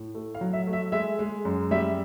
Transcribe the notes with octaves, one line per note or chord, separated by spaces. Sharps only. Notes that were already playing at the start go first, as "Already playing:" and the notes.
Already playing: A2
A3
F5
F#3
E5
A3
E5
G#3 E5
G#3
F#2
G3 E5